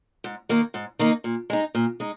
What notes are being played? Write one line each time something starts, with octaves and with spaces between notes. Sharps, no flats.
G#2
D#3 A#3 D#4
G#2
D#3 A#3 D#4
A#2
G#3 D#4
A#2
G#3 D#4